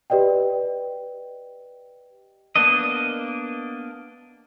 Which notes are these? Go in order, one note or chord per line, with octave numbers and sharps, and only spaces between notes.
G4 B4 D5 D#5 G5
A#3 B3 D4 D#5